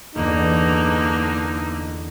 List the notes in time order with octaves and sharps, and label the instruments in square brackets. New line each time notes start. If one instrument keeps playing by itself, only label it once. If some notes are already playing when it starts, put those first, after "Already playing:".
[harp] G1 E2 [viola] D3 A#3 [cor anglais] D#4